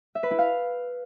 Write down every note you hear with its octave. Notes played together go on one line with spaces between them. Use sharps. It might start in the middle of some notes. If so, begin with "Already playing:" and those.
E5
B4
E4
F5